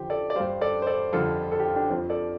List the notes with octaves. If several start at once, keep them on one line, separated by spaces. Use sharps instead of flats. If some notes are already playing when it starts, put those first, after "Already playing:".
Already playing: F2 D3 F3 G4 C5
A4 D5
D5
G2 G3 C5 F5
A4 D5
C5
A4 D5
F2 D3 G3 F4 A4
A4
G4
F4
D4 G4
F2 F3 C4 F4
A4 D5